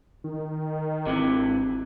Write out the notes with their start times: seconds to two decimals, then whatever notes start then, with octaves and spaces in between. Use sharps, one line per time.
0.24 D#3
1.07 G#1 C3 E3